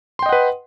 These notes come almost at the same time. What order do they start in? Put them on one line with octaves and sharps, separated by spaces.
C6 G5 D#5 F#5 B4